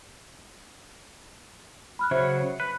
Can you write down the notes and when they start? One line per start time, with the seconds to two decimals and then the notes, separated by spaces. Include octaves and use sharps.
1.99 B5 F6 F#6
2.11 C#3 F#3 C5 C#5 E5
2.60 B4 F#6